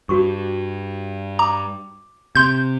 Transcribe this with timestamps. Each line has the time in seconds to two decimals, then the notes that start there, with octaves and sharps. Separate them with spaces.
0.09 G2 F#4 C#6
1.39 A#5 D6
2.35 C3 C6 G6